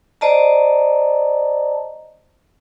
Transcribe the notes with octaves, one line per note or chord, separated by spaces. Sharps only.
C5 D5 D#5 A5 A#5